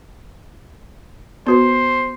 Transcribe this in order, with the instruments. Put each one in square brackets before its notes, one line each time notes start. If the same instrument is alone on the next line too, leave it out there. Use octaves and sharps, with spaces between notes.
[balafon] B3 F#4 B4 [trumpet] C5